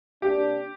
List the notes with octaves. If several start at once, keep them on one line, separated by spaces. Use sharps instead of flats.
C3 A#3 D4 G4